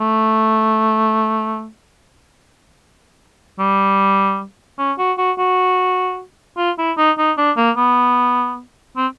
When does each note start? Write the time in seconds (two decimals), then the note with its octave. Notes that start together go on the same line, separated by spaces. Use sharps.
0.01 A3
3.59 G3
4.79 C#4
4.98 F#4
5.18 F#4
5.38 F#4
6.57 F4
6.78 E4
6.98 D#4
7.18 D#4
7.38 D4
7.57 A#3
7.77 B3
8.97 C4